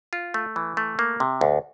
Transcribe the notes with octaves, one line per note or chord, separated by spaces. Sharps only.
F4
A3
E3
A3
A#3
C3
D2